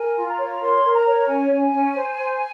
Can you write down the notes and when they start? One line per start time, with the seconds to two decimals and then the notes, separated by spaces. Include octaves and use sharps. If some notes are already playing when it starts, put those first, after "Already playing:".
Already playing: A#4 G#5
0.15 F4
0.27 A#5
0.37 C#5
0.60 A#4 C6
0.83 A#4
0.93 A#5
1.05 C#5
1.27 C#4 G#5
1.50 C#4
1.72 C#4
1.95 C5
2.17 C5